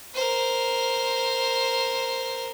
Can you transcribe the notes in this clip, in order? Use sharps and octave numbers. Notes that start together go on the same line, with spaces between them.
A#4 C5